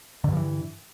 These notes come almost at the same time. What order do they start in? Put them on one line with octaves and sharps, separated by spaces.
D3 G2 F3 E3